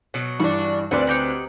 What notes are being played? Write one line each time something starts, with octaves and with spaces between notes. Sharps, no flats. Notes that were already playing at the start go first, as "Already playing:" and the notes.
B2 F#3
G2 E3 D4 F#4
D2 C4 B4 D5 F#5
D#4 G4 F#5